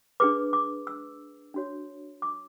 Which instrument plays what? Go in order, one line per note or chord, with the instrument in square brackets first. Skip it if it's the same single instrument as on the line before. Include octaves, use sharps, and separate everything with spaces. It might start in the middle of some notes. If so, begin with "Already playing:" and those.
[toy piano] D4 G#4 B4 D6
D6
E6
D4 F#4 C#5
D6